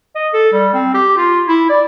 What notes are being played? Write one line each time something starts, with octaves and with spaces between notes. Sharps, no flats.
D#5
A4
G3
C4
G4
F4
E4
D5